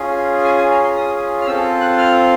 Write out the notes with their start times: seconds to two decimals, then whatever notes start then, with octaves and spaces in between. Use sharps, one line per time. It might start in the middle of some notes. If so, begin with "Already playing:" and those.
Already playing: C#4 F4 G#4
0.44 G#5
0.58 G#5
0.71 A#5
0.84 C6
0.97 D#6
1.41 F6
1.47 C4 F4 A4 E6
1.81 F#6
1.98 F6